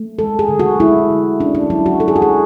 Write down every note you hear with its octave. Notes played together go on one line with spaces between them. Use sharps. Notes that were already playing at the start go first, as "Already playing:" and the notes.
Already playing: A3
G#3 A4
G#4
D3
F#4
G#3 E4
D3
C#4 D4
D4
F#3 E4
F#4
F#3 A4
G#4
F#4
G#4